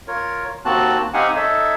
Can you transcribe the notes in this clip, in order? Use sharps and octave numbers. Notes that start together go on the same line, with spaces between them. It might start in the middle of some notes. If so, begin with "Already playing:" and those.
F4 A#4 C#5
D#2 A#3 C4 F#4 A5 F#6
C4 D#4 G4 F5 F#5 G#5
D#4 A4 C#5 E5